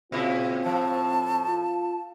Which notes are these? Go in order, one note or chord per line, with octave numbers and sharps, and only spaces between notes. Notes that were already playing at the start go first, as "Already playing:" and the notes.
A#2 C#3 C4 E4 F4
A2 F3 A5
F4